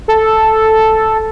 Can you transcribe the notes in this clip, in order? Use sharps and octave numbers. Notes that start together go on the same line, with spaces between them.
A4